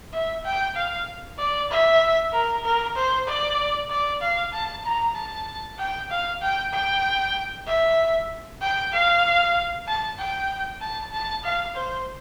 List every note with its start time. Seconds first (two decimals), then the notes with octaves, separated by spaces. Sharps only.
0.13 E5
0.45 G5
0.76 F5
1.39 D5
1.71 E5
2.33 A#4
2.65 A#4
2.96 C5
3.28 D5
3.90 D5
4.22 F5
4.53 A5
4.85 A#5
5.16 A5
5.79 G5
6.10 F5
6.42 G5
6.73 G5
7.67 E5
8.62 G5
8.93 F5
9.87 A5
10.19 G5
10.81 A5
11.13 A5
11.44 F5
11.75 C5